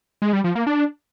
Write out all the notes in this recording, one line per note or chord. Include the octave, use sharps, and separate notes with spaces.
G#3
G3
F3
A#3
D4